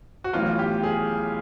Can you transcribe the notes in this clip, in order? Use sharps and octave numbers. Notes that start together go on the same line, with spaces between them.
F#4
B1 A2 E3 F4
G4
G#4